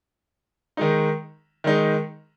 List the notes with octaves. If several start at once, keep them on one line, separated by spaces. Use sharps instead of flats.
D#3 G#3 D#4
D#3 G#3 D#4